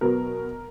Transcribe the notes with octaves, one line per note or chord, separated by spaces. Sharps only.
B2 F#3 B3 A#4